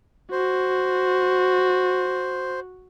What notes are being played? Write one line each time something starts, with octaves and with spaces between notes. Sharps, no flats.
F#4 C5